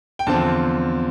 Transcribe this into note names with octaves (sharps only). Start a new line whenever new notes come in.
G5
E2 D3 F3 C4 A5